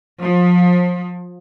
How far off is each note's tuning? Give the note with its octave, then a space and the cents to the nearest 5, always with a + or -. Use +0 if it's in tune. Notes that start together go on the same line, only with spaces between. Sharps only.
F3 +30